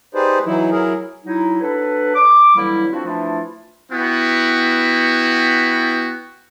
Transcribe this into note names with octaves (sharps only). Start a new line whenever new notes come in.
D#4 G4 G#4 B4 C5 D5
E3 F#3 D#4 E4
F#3 E4 G#4 A#4
F#3 D#4 E4
F#3 D4 A4 B4
D6
D3 E3 F#3 G3 A#3 E4
F3 C4 D4 F4 F#4
E3 F3 A3 D4 E4 F4
B3 E4 F#4 G5